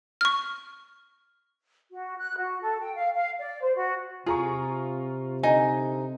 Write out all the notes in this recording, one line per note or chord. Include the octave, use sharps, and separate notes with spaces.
C#6 F6
F#4
F#6
F#4
A4
G5
F5
F5
D5
C5
F#4
C3 F4 G#4 A#5 C#6
D3 D#4 G#5